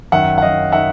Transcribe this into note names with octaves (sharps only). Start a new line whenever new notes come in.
F#2 D#3 E5 F#5
F#5
F#2 D#3 D#5 F5
D#3 E5 F#5